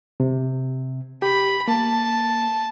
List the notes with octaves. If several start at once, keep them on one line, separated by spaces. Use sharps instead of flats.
C3
G4 B5
A#3 A5